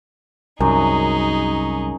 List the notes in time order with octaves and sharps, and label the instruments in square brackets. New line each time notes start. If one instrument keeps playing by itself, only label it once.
[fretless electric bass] C2 [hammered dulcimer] F#2 [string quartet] D#4 G#4